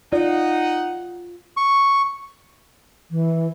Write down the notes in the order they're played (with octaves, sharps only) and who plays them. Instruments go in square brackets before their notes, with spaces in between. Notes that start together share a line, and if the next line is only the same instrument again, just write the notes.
[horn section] D#4 F#5 [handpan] F4 [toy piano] D5
[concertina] C#6
[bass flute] E3